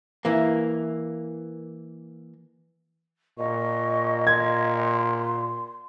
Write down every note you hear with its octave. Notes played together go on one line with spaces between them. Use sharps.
E3 A#3
A#2 D#5 C#6
C6 G#6